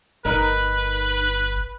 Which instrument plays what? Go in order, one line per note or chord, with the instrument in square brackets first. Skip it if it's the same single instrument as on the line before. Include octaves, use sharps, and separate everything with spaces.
[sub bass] G1 [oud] D#4 A#4 [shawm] B4